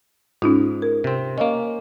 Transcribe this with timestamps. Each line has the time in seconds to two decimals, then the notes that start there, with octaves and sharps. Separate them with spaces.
0.42 G#2 C#4 D#4 F4
0.82 A#4
1.04 C3 C4
1.38 A#3 C#4 D#5 F5